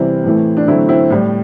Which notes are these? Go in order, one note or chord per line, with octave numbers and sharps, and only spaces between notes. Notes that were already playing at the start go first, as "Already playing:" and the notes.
Already playing: C3 E3 G3 C4 E4
A2 E3 A3
D4
D3 F#3 A3 C4 E4
C4 E4
A2 G3